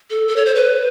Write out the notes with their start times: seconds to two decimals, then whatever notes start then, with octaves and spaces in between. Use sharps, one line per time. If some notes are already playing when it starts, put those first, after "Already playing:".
0.10 A4
0.28 A4
0.36 C#5
0.46 C5
0.55 B4